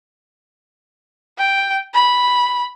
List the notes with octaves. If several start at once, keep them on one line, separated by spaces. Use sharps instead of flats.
G5
B5